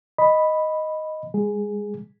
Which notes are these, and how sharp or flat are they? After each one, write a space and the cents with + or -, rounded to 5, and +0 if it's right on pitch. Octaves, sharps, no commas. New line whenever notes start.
D#5 +0 B5 +0
G#3 -35 G#4 +0